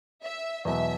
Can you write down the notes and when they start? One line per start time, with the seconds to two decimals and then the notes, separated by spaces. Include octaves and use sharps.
0.23 E5
0.65 E2 B2 F#3 E5